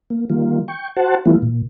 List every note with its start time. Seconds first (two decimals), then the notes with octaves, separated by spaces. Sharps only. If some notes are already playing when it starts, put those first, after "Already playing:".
0.10 A#3
0.30 D#3 G3 A#3 F4
0.68 G5 C#6
0.96 F#4 C5 F#5 A5
1.26 E3 G3 A3 B3 E4 F4
1.42 A#2